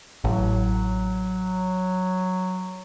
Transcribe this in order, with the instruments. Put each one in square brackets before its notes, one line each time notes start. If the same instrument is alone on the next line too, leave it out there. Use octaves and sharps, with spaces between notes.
[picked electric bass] A1 [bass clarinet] F#3